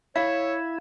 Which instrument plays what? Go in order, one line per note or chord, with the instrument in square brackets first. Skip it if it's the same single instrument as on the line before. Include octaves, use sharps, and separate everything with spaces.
[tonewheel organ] E4 [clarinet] C#5 [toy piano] F5